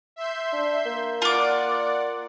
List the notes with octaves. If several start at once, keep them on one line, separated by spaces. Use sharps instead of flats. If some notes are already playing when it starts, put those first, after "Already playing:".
E5 C6 G6
D4
A#3
F4 D5 F#5 D6